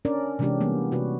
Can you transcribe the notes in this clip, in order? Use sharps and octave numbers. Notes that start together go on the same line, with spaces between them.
C#4 D4 A#4 D5
C3 E3 G#3 C#4 D4 G4
E3 G3 A#3 B3
C3 F#4 B4